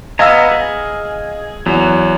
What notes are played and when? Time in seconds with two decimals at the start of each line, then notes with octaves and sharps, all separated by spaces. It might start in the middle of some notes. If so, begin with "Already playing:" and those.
0.19 B3 D#5 F5 G#5 A#5 E6
0.51 G#4
1.66 E2 F#3